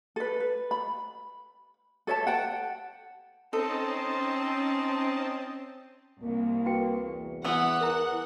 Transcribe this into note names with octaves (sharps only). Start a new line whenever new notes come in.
A4 B4
B4
B5
A4 C#5 E5 A5
F#5 G5 A5
C4 C#4 D#4 A4 D#5 A5
C2 A#3
F#4 B4 G5
E2
E3 B3 F#5
A#4 E5 A#5